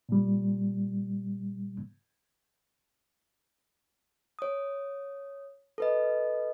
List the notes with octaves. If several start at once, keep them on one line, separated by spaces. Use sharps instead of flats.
A#2 G3
C#5 D#6
A4 B4 D#5